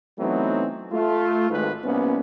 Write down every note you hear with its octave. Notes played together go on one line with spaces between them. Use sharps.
E3 F#3 A3 B3 C4 D#4
A3 F4
G#1 G#2 B4
C2 A#3 B3 C#4